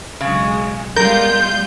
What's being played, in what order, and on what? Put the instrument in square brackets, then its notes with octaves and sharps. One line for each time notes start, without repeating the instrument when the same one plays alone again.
[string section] B1 F#3 G#3 [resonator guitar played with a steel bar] C#3
[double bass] G3 [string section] G#3 B3 F4 [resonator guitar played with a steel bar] A#4 [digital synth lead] G6